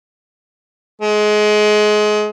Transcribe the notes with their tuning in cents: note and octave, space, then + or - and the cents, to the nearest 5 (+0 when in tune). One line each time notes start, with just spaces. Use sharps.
G#3 +25